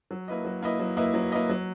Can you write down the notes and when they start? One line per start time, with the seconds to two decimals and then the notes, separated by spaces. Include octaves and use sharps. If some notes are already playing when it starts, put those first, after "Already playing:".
0.11 F#3
0.28 A#3 E4 B4 D#5
0.45 F#3
0.62 A#3 E4 B4 D#5
0.79 F#3
0.97 A#3 E4 B4 D#5
1.14 F#3
1.32 A#3 E4 B4 D#5
1.49 F#3